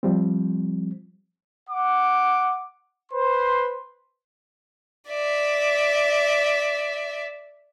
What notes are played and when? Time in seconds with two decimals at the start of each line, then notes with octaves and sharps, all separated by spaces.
0.03 F3 G3 C4
1.70 F#5 D6
3.12 B4 C5 C6
5.10 D5 E5